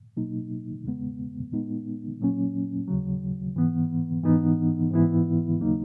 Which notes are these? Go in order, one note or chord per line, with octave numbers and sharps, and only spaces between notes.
B2 F#3 A#3 D#4
E2 C#3 G#3 B3
A#2 G#3 B3 D#4
A#2 F#3 A#3 C#4
D#2 C#3 F#3
G#2 E3 B3
G#2 E3 B3 D#4
G#2 E3 B3 E4
D#2 C#3 F#3 A#3 D#4